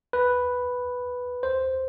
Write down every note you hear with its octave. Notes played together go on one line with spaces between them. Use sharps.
B4
C5